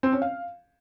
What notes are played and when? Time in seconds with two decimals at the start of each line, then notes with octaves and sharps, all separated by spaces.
0.03 C4
0.12 C#4
0.22 F5